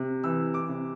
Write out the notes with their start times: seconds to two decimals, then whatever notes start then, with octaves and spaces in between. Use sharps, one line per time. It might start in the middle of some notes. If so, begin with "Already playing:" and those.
Already playing: C3
0.24 E3 E6
0.54 D6
0.69 C3